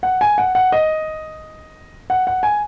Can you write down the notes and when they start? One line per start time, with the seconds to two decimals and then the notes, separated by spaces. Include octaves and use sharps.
0.03 F#5
0.21 G#5
0.38 F#5
0.55 F#5
0.72 D#5
2.10 F#5
2.27 F#5
2.43 G#5